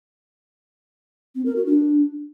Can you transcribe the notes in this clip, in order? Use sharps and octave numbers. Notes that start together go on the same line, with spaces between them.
C4
A#4
F#4
D4